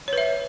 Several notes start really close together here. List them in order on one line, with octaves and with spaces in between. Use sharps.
C#5 B4 E5